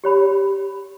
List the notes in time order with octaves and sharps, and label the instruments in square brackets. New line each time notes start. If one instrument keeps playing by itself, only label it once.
[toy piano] G4 C#5 B5